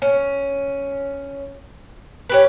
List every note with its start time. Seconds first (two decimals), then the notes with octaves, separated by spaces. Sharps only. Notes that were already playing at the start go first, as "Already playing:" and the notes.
0.02 C#4
2.30 C#4 G4 B4